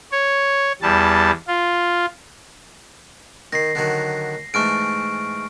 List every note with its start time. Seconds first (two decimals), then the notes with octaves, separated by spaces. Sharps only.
0.12 C#5
0.82 E2 G3 A5
1.48 F4
3.53 D#3 A#6 C7
3.75 D3 D#3 F#3
4.54 G#2 E3 A3 C#6 F6 D7